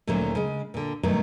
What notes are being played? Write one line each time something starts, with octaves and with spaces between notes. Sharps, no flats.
D2 A#2 D#3 F#3 A3 C#4
C#3 G#3
A#2 D3
G2 B2 D#3 F#3 A3